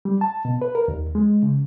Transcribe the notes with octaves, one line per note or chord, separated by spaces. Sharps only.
G3
A5
B2
B4
A#4
D#2
G#3
C#3